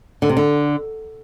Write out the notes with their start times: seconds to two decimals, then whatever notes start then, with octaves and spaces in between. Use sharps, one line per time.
0.22 D3
0.29 C3
0.37 D3